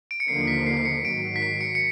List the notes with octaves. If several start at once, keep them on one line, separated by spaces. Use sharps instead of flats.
D7
C#7
D#2 D3 F3 A#3 D#4 C7
C7
B6
C7
C7
C#7
G#2 D#3 F#3 D7
B6
C7
C#7
C#7